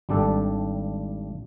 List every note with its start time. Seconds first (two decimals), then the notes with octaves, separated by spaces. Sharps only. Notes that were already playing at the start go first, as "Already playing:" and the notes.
0.09 G#1 G3 D4 G4 A4